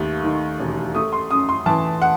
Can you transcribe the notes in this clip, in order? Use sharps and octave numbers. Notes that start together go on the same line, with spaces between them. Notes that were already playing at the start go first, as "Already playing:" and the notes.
Already playing: D#2 A3
D#3
E1
A3 D#6
C6
F#2 D#6
C6
E3 A5
F#5